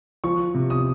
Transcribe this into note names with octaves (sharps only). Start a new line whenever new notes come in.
F3 C#6
C3
D#6